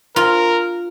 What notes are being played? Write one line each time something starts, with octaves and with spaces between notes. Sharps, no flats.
F4 A#4